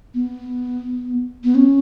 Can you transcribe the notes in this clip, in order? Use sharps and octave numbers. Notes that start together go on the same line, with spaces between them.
B3
B3
C#4